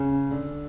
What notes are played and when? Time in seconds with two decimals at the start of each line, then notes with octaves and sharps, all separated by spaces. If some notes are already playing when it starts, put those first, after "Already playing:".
Already playing: C#3
0.31 D3